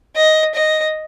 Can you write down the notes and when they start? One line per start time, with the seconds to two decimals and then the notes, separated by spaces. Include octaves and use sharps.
0.16 D#5
0.55 D#5